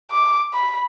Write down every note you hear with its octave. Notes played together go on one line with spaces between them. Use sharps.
D6
B5